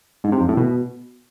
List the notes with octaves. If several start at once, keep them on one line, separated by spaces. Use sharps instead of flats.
G#2
C3
F2
A2
B2